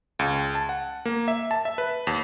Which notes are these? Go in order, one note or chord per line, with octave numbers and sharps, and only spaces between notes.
C#2
A5
F#5
A#3
E5
A5
E5
B4
D#2